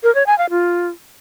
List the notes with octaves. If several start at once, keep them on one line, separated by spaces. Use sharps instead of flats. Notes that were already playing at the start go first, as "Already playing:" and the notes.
A#4
C#5
G#5
F5
F4